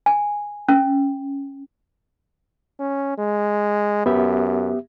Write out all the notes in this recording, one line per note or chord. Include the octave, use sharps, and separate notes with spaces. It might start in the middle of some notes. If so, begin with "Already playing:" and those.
G#5
C#4
C#4
G#3
F#2 B3 G4 E5